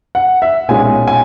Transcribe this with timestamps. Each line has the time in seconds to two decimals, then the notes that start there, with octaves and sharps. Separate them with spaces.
0.15 F#5
0.42 E5
0.68 B1 A#2 G#3 C#4 G#5
1.08 G#5